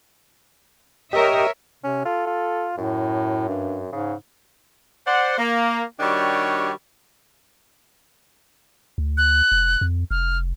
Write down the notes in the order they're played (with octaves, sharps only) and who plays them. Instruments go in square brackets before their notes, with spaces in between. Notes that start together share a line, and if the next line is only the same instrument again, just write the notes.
[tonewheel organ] G4 D#5 [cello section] A#4 C#5 E5
[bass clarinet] C3 [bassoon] C#4
[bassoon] F4 [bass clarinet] A4
[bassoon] F4
[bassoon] F#2 [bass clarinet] A2
[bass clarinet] G2
[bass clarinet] G#2 [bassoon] C#3
[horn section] C5 D5 F#5
A#3
D#3 G3 D4 F#4 G4 C#5
[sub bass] D2
[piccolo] F#6
[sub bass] F1
F2
[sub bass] F1 [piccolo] F6